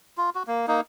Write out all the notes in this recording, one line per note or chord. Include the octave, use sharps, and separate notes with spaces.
F4
F#4
A#3
A#3 D#4